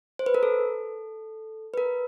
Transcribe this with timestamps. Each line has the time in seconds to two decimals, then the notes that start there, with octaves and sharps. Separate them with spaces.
0.19 C5
0.26 B4
0.35 A#4
0.43 A4
1.74 B4
1.78 A#4